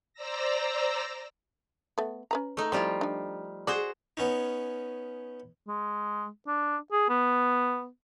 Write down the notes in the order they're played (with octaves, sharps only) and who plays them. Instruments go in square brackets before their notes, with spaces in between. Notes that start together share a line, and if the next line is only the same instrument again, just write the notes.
[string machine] C5 D5 A#5 E6 A#6
[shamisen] A3 B3
C#4 B4 A#5
[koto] A3 D#4
[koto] F3 G3 F4 [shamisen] C4 E4
[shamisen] D4 D#4
[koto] F#4 G#4 C5 [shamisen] D5
[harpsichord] B3 C#4 D#4
[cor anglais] G#3
D4
G#4
B3